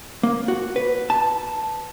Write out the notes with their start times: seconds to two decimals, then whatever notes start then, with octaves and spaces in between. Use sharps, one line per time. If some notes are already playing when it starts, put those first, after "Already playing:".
0.23 A#3
0.48 F#4
0.76 B4
1.10 A5